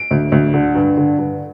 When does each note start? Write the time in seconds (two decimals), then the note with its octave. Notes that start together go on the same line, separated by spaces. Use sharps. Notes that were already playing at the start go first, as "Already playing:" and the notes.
Already playing: D7
0.11 D2
0.32 D2
0.54 D3
0.75 G2
0.97 D3
1.19 G2